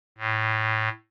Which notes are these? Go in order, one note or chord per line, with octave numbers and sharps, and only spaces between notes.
A2